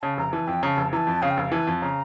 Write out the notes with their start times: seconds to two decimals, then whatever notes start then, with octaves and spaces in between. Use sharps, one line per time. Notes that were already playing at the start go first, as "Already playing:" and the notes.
0.02 C#3 A5
0.17 F1 A#5
0.33 E3 A5
0.47 F2 G5
0.63 C#3 A#5
0.67 A5
0.77 F1
0.93 E3 A5 A#5
1.07 F2
1.22 C#3 F5
1.31 G5
1.37 F1 F5
1.52 E3 A5
1.67 F2
1.82 C#3 A#5